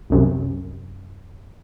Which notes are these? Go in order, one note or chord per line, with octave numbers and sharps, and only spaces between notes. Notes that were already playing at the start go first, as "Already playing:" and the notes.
C2 F#2 C3